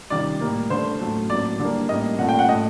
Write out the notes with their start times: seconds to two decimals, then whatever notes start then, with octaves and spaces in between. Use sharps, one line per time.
0.10 C3 D#3 G3 D5
0.40 A2 G3 A#3
0.70 D3 A3 C5
1.00 A2 F#3 A3
1.30 A2 F#3 A#3 D5
1.59 D3 G3 A#3
1.89 A2 G3 A#3 D#5
2.19 A#2 A3 F#5
2.29 G5
2.39 F#5
2.48 A3 D#5
2.51 A2